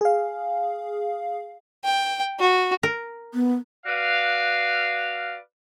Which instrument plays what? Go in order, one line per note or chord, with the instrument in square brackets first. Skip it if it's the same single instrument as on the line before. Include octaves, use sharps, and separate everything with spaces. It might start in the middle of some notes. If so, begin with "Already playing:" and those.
[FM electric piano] G#4 F5
[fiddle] G5
F#4
[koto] A#4
[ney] B3
[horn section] F#4 B4 D5 F5